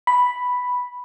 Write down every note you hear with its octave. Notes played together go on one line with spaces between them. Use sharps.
B5